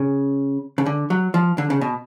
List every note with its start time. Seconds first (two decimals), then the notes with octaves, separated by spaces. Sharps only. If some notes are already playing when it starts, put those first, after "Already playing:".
Already playing: C#3
0.78 C#3
0.86 D3
1.10 F#3
1.34 F3
1.58 D3
1.70 C#3
1.81 B2